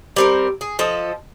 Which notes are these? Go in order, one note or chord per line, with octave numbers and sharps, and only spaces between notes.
G3 C4 A#4
G#4
F3 A4 D#5